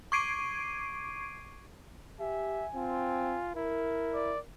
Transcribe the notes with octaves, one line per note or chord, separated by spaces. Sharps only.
C#6 D6 G#6 C7 D7 D#7
G4 E5 G#5
C4 F4
E4 A#4
D5